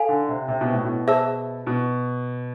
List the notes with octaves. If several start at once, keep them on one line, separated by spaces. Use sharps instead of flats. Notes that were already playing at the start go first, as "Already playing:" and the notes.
Already playing: A4 F5 G#5
D3
C3
C3
B2
A2
B2
G#4 C5 E5 A5 E6
B2